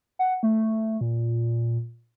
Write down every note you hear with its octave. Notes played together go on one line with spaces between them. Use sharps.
F#5
A3
A#2